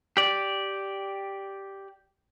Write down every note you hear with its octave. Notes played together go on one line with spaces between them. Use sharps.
G4 D5